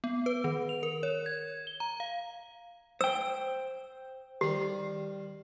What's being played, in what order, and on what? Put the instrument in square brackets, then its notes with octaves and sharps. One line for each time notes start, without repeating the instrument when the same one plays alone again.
[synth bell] B3
B4
D#3
F7
A#4
C#5
G#6
G7
A#5
F5
[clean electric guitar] C5 G5 [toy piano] E6
[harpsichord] D#3 G3 [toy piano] G4